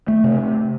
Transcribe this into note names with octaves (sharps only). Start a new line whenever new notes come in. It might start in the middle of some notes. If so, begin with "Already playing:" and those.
A3
C3